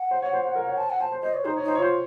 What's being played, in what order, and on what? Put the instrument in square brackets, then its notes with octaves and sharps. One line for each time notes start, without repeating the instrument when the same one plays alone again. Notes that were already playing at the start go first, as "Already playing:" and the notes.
Already playing: [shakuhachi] F#5
[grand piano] C5
C#5
C5
C5
A#4
C#5
[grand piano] C5 [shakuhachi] A5
[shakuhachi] F#5
[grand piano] C5 [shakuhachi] A5
[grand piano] C5
[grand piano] C5 [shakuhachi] D#5
[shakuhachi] C#5
[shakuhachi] D#4 [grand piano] C5
[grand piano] C#5
[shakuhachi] D#4
[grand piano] C5
C#5
[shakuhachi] F4 [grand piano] C5